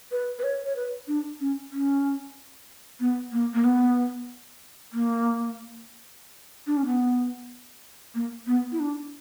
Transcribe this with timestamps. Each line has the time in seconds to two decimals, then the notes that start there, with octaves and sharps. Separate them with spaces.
0.11 B4
0.39 B4
0.43 C#5
0.65 C#5
0.76 B4
1.08 D4
1.40 C#4
1.71 C#4
3.00 B3
3.32 A#3
3.54 A#3
3.64 B3
4.93 A#3
6.67 D4
6.77 C#4
6.86 B3
8.15 A#3
8.47 B3
8.72 E4
8.80 D4